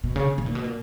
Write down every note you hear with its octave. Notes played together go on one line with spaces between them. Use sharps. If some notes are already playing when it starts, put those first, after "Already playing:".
B2
C#3
B2
A#2
B2
A#2